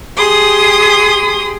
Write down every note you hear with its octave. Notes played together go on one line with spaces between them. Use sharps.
G4 G#4 C6 D#6